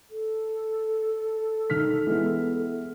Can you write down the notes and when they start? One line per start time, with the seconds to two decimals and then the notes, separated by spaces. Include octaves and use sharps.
0.10 A4
1.70 D#3 F6 B6
2.06 E3 G#3 B3